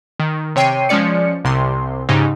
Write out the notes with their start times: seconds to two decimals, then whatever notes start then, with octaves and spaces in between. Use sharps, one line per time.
0.19 D#3
0.55 C3 C#5 G5 C7 D#7
0.89 F3 G#3 C#4 D5 C#7
1.44 C2 C3 C6
2.09 G#2 C#3 D#4 G4